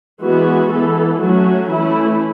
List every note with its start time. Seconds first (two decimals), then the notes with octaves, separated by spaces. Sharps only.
0.22 E3 G#3 B3 F#4
0.71 E3 B3 A4
1.21 F#3 A3 C#4 F#4
1.71 E3 A3 C#4 E4